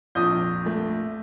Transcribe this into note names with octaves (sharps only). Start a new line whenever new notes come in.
A#1 F2 D#6 G6
A3